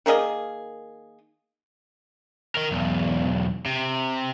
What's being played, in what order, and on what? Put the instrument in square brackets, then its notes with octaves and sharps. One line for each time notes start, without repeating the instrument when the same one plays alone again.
[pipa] D#3 A#3 G#4 D#5
[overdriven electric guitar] D#3 A#4
B1 E2
C3